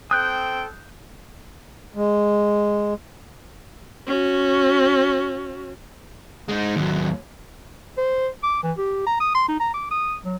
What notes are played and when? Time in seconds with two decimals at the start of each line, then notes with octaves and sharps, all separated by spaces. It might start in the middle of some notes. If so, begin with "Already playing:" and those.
0.11 C4 A4 G5 D#6 F#6 G6
1.94 G#3
4.07 C#4 F#4
6.48 G#3 D#4
6.76 D#2 F#3
7.97 C5
8.43 D6
8.63 E3
8.78 G4
9.06 A#5
9.20 D#6
9.35 C6
9.48 D#4
9.60 A#5
9.74 D6
9.91 D#6
10.24 F#3